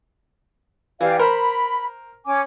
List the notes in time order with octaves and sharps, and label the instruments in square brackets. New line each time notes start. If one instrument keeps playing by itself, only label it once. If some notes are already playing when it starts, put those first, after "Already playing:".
[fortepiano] E3 [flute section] G4 D5 F5
[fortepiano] A#4 C5 [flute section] B5
[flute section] C#4 G#5 D6